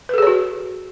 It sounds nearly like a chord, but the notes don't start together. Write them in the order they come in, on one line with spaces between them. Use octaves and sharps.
B4 A4 G#4 C#5 F#4